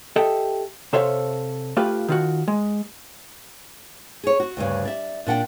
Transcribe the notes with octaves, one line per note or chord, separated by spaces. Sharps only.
G4 A4 D#5 E5 G5
C3 A4 C5 C#5 E5 F5
A3 F4 G4 B4 F5
D#3 F4 F#4
G#3
G#4 C#5
F#4
D2 G2 C#3
D5 E5
A#2 D4 F#5 G5